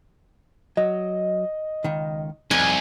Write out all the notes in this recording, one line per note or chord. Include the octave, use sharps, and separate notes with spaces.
F#3 D#5
C#2 D#3
C2 F2 D#4 G#5